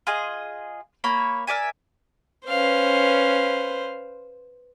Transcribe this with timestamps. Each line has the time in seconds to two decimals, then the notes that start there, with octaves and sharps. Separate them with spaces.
0.07 F4 G#4 D#5
1.04 A#3 C#5 B5
1.47 A#4 D5 E5 G#5
2.47 C#4 B4 C5 F5